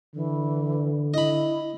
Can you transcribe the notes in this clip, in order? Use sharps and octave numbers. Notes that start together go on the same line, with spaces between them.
D3 E3
E4 D#5 B5